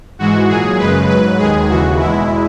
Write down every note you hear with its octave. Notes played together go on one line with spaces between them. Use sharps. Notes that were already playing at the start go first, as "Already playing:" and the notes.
G#2 E3 G#3 F#4
A#2 F#3 G#4
F#2 C#3 G#3 B4
G#2 F#3 B4
D#2 D#3 G#3 G#4
D#2 C#3 E3 F#4
E2 B2 G#3 E4